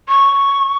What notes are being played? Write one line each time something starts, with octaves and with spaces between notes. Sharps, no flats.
C#6